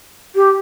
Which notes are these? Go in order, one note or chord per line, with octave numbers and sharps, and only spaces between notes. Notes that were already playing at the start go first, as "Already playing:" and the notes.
G4